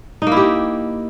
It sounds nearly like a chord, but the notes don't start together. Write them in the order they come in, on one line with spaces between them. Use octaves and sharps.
D#4 A#3 E4 G4